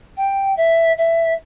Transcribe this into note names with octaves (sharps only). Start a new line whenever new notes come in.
G5
E5
E5